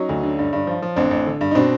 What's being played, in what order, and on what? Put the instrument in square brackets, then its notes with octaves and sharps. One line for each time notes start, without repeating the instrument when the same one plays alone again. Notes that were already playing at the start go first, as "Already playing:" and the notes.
Already playing: [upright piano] F#3 C#4 D#4
D2
D3
G2
G2
F3
F3
A1 C4 D4
A1
D3
G2
D#4
B2 C4 D4